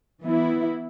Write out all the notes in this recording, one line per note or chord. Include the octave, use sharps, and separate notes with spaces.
E3 B3 E4